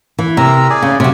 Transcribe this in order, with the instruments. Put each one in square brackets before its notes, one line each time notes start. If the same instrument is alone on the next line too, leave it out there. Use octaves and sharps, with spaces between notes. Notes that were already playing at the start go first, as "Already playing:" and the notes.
[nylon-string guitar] E3
[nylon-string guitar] C3 [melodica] A#4 A#5 E6
[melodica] G#4 D5 G#5
[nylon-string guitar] C#3
C3 F#3